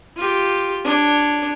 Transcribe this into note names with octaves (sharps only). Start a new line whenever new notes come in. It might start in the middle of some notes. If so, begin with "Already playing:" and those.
F4 G4
D4 C#5